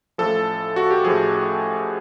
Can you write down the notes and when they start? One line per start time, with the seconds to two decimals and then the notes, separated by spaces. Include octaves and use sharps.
0.18 A1 A2 F3 A4
0.76 F#4
0.90 G4
1.04 A1 A2 F3 G#4